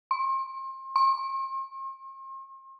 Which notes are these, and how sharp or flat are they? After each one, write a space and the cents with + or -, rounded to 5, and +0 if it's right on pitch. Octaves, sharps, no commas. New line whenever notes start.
C6 +35
C6 +45